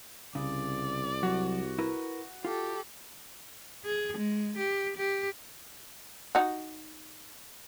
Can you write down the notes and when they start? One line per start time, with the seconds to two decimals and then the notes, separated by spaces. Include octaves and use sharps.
0.35 C2 C#3 D5
1.23 F#3 F#4
1.79 E4 A#4 B4
2.45 F4 G4 A4
3.85 G#4
4.17 G#3
4.58 G4
4.97 G4
6.35 D#4 F#4